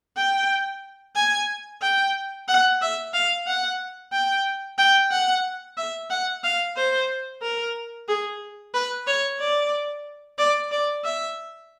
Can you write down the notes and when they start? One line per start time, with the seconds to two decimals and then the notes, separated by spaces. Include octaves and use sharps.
0.17 G5
1.16 G#5
1.82 G5
2.48 F#5
2.82 E5
3.14 F5
3.47 F#5
4.13 G5
4.78 G5
5.11 F#5
5.77 E5
6.10 F#5
6.44 F5
6.77 C5
7.42 A#4
8.08 G#4
8.74 B4
9.07 C#5
9.40 D5
10.38 D5
10.72 D5
11.04 E5